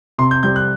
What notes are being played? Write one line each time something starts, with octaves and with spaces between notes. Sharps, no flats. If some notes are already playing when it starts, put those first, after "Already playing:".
C3 C6
G6
G3 C4 G6
F#6